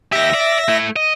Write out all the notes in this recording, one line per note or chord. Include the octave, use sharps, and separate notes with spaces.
D#2 G4 E5 A#6
D5
A3 E4
D#5